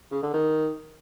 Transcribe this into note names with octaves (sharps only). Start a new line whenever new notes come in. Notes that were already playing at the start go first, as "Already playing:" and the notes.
C#3
D3
D#3